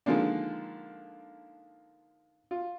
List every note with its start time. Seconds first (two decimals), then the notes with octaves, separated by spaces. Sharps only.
0.06 D3 D#3 F3 G#3 A#3 D4
2.51 F4